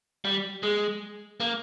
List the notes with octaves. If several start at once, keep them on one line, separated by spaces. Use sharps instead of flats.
G3
G#3
A#3